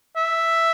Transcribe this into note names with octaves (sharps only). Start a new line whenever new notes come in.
E5